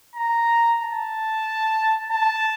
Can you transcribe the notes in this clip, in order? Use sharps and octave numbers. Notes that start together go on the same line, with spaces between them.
A#5
A5
A5